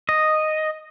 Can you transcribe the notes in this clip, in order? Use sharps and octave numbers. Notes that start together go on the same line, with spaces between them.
D#5